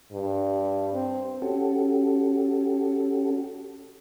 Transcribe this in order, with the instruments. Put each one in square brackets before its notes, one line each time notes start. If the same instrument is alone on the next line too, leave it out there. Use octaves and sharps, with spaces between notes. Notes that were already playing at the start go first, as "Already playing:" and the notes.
[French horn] G2
C4
[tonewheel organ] C#4 F#4 G4 A4